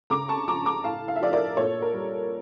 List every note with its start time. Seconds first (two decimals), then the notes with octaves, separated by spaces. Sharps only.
0.10 C#3 A#5 D6
0.28 A5 C#6
0.48 F3 A#5 D6
0.66 A#5 D6
0.84 A2 F5 A5
1.08 F5
1.16 E5
1.21 F3 D5 F5
1.33 A#4 D5
1.57 A#2 A4 C#5
1.82 A#4
1.94 G3